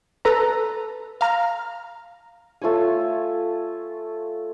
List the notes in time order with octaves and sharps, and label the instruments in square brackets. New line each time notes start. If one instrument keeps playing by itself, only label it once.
[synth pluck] A4 B4 A#5
F5 A#5 F6
[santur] A3 F4 C#5 G#5